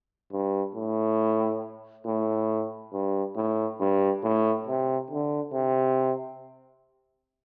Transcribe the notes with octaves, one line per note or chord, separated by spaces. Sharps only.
G2
A2
A2
G2
A2
G2
A2
C3
D3
C3